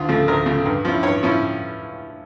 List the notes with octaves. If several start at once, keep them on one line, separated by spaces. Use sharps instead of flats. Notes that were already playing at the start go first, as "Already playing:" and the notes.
Already playing: D2 F4
C#3 F3 A3
D2 A#4
C#3 F3 A3
G2
F3 C#4 E4
G2 C#5
F3 C#4 E4